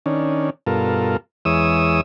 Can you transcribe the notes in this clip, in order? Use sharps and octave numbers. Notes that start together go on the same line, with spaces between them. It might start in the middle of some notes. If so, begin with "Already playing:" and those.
D#3 C#4 D4
G2 B2 F4 A4 A#4
E2 E3 G#3 C#5 D#6 E6